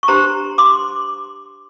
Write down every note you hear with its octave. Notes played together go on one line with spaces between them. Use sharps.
C#6
D4 G4 C5 A#5 C6
C6 D6